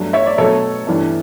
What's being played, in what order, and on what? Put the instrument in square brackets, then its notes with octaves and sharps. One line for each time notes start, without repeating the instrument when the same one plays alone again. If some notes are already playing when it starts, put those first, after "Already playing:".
Already playing: [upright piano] G2 F#3 A3
C#5 E5
D5
B2 F#3 A3 A4 C#5
G2 E3 A3